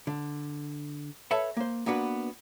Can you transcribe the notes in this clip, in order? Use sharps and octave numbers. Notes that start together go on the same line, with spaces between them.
D3
A4 B4 C#5 E5 A5
A#3 C5
A#3 B3 D4 F#4 B4